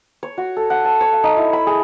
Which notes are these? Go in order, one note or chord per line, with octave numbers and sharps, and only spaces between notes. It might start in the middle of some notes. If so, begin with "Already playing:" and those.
C#5
F#4
A4
F#5
A5
C#5
F5
D#4
E4
B5
G#4